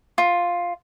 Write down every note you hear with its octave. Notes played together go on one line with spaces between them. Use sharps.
F4